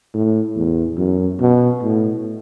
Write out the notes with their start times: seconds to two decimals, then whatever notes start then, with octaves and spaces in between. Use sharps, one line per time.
0.14 A2
0.56 E2
0.98 F#2
1.40 B2
1.83 A2